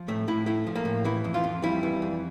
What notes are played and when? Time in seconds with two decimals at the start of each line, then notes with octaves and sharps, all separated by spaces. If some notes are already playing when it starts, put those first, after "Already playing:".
Already playing: F3
0.08 A2 A3
0.28 A2 E4
0.46 A3 E4
0.67 F3
0.75 A#3
0.85 A2
1.05 E3 E4
1.24 F2
1.34 F4
1.44 F2
1.62 G3 E4
1.83 E3
2.02 F2